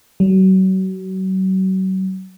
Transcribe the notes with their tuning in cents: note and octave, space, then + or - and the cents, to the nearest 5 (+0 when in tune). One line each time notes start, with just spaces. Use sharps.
F#3 +35